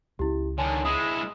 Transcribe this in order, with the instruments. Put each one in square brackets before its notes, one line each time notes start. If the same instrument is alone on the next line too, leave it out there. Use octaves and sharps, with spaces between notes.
[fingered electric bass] C#2 C#4 [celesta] E4 G4
[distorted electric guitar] D3 D#3 [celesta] C#5 G#5 A5
[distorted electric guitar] G#3 E4 [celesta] D#6